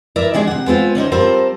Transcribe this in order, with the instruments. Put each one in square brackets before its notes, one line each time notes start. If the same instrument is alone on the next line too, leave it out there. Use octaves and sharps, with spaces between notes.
[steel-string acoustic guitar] E4 A#4 D5 E5
D#3 G#3 D4 G#4
C3 F#5
G#3 B3 C4 F4
D3 C#4 D#4 C5
G3 C4 F4 A4 A#4 C5